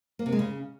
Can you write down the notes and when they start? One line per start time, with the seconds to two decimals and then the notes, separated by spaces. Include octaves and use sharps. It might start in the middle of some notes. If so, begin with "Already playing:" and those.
0.19 A#3
0.26 C3
0.32 G#3
0.39 C#3